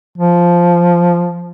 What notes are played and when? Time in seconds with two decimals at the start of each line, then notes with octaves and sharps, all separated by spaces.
0.18 F3